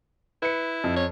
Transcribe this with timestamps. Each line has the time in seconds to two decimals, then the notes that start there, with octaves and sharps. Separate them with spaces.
0.42 E4 B4 C#7
0.84 F2
0.96 C#5